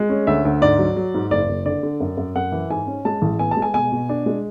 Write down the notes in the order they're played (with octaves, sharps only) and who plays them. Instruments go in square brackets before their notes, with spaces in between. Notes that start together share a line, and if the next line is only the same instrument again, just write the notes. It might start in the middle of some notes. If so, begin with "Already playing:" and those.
Already playing: [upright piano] G#3
C#4
D2 E5
D2
G#2 D5
F#3
F#3
G#2
F#1 D5
F#1
D3 D5
D3
F#2
F#2
F#2 F#5
E3
G#2 G#5
C#4
G#3 A5
A1
B3 G#5
A5
G#3
G#5
B2 G#5
B2
D4
G#3